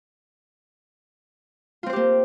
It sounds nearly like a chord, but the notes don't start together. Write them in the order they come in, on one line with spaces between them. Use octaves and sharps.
F4 C4 C5 G4 A#3